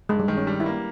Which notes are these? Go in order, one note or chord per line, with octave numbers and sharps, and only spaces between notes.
G2 G#3
G3
D#3 G#3
C#4
G3 D4
E4
A#3